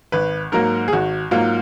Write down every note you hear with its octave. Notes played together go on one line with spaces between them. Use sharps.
G#1 B4
G#2 F#3 A#3 A#4
G#4
G#1 F#4
G#2 F#3 A#3 F4